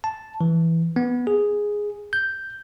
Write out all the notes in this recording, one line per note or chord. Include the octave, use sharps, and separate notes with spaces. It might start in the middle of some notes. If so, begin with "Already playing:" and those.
A5
E3
B3
G#4
G6